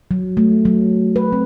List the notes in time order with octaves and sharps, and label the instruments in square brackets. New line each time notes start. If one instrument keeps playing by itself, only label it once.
[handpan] F#3
A3
F#3
B4
C4